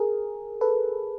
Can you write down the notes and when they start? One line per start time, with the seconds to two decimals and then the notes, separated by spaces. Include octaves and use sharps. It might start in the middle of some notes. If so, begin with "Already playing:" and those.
Already playing: G#4 A#4
0.61 A4 B4